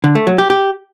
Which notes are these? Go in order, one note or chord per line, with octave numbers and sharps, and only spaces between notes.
D3
A3
F#3
G4
G4